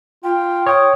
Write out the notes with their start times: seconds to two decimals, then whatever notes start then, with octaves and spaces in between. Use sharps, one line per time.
0.24 F4 G5
0.67 C#5 G5 D#6